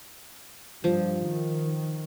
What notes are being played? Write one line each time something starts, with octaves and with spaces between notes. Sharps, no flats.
G2 F3
D#3